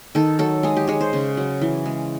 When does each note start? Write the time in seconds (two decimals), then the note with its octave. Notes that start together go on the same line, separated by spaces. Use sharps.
0.15 D#3 A4
0.39 F#3 A4
0.63 G#3 G#4
0.76 G4
0.87 G#3 C#5
1.01 C5
1.13 C#3
1.37 F#3
1.61 E3
1.86 G#3